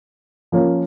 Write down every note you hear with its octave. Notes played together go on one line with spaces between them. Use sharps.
F3 A#3 C#4 F4 A#4